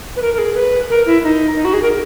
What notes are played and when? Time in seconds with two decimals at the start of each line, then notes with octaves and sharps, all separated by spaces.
0.16 B4
0.22 A#4
0.34 A#4
0.38 G#4
0.55 B4
0.90 A#4
1.06 E4
1.24 D#4
1.56 D#4
1.65 F#4
1.73 G#4
1.82 A#4